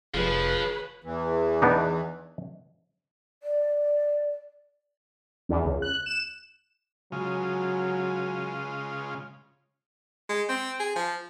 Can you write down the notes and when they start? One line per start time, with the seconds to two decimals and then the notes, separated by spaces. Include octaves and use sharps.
0.14 F1 F3 G#4 B4 C#5
1.04 E2 E3
1.62 B3 D4 D#4
3.43 D5
5.49 E2
5.65 C#2
5.82 F#6
6.06 E7
7.12 C#3 F#3 G#3 F4
10.29 G#3
10.49 C4
10.80 G#4
10.96 F3